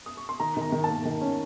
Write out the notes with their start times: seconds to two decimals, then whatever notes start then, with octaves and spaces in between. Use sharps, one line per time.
0.06 D#6
0.17 C#6
0.29 C6
0.40 D#3 A#5
0.57 D#3 A#5
0.72 D#3
0.84 A#3 A5
1.05 D#3
1.21 C#4